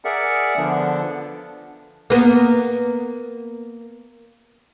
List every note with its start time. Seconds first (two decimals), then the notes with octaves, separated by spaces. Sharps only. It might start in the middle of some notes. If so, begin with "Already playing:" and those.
0.05 G#4 A#4 D5 E5 F#5
0.57 D3 F3 B3 D4
2.10 A#3 B3